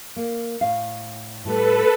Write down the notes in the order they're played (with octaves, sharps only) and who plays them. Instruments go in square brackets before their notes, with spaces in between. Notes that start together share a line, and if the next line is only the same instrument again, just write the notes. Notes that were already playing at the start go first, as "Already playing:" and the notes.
[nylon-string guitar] A#3
A2 F5
[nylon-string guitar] A2 G3 A3 [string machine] A4 B4